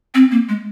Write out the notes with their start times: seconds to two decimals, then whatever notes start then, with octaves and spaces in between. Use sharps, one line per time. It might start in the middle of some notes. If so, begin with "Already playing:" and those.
0.14 C4
0.31 A#3
0.48 G#3